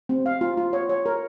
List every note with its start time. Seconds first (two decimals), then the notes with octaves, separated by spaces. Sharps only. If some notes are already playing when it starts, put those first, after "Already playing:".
0.09 C4
0.26 F5
0.41 F4
0.57 F4
0.73 C#5
0.89 C#5
1.06 A#4